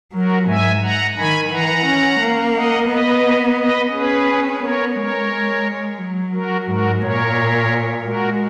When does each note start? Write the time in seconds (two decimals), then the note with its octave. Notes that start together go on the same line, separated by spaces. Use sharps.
0.14 F#3 F#4 A#4
0.48 G#2 E5 G#5
0.82 F#5 A#5
1.17 D#3 G#5 B5
1.51 E3 F#5 A#5
1.86 C#4
2.20 A#3
2.55 D#5 F#5
2.88 B3 B4 D#5
3.57 B4 D#5
3.92 C#4 G#4 B4
4.60 B3 A#4 C#5
4.95 G#3 A#4 C#5
5.99 F#3
6.33 F#4 A#4
6.67 G#2 F#4 A#4
7.01 A#2 A#4 C#5
8.05 G#3 F#4 A#4